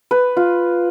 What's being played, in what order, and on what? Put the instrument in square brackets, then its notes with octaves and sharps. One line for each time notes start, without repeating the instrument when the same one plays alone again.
[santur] B4
F4